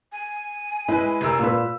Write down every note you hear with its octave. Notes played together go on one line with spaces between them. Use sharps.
G#5
G#3 E4 B4
F1 A#4 E6
A#2 B4 E6